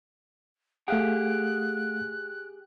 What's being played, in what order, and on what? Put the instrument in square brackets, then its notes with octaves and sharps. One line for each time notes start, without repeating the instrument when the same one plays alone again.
[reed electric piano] A3 F5 F#5 [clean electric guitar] G4 G#4 [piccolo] F#6